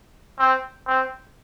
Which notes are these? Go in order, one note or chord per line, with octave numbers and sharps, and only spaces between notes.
C4
C4